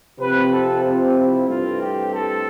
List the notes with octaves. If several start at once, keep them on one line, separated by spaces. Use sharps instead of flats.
C3 F3 C4 B4
A4
F4
E4
G2 E3 A3 C4 F4
G4
A4